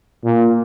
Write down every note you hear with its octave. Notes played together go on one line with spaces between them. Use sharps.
A#2